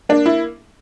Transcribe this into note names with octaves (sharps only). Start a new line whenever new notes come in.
A#3 D4
E4